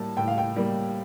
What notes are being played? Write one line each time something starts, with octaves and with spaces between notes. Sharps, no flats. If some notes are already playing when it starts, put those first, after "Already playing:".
Already playing: A2 G3 A#3 A5
A2 G5
F5
G5
G3 A#3